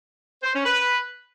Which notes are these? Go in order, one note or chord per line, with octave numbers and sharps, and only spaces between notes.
C5
C#4
B4